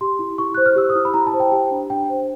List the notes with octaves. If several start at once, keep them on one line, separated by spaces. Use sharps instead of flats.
G4 C6
E4
E4 C#6
C5 F#6
F6
G4 E6
D#6
E4
B5
E4 A#5
A5
C5
G5
G4 G5
D4
D4 G5
C5